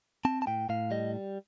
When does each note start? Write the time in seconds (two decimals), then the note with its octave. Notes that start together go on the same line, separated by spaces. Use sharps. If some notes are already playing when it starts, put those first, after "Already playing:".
0.25 C4 A5
0.42 A5
0.47 A2 G5
0.69 A2 F5
0.91 G3 D#5